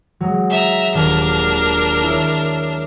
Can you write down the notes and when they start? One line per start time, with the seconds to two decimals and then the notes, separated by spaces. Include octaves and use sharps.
0.21 F#3 G#3
0.50 E5 A#5
0.94 D#1 D4 A#4
2.03 E4 C#5